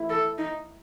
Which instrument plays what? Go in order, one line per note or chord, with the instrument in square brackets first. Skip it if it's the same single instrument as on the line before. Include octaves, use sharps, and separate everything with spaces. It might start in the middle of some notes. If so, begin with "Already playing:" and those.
Already playing: [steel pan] E4
[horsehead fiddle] A4
D#4